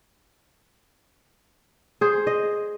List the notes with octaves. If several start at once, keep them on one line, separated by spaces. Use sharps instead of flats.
G#4 C5
D#5